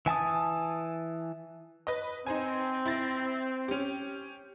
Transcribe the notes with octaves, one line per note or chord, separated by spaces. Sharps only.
E3 G#5 A5 D#6
B4 D#5
C4 D#4 C5 G#5
E4 A6 A#6
C#4 G4